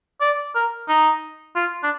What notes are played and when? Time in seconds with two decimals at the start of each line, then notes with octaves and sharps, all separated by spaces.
0.21 D5
0.55 A#4
0.89 D#4
1.56 F4
1.83 D4